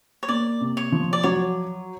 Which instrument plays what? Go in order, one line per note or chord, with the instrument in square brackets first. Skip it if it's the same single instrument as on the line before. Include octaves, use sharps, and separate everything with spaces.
[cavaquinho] C#5
[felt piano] A#3 [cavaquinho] D5
[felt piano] C3
[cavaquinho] C#5
[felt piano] F3
[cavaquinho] D5
[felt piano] F#3 [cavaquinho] C#5